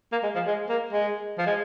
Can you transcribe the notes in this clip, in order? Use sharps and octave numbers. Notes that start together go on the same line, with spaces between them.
A#3
G#3
F3
G#3
A#3
G#3
F3
G#3